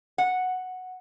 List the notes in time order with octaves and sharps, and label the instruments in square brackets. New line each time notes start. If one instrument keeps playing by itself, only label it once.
[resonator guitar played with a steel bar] F#5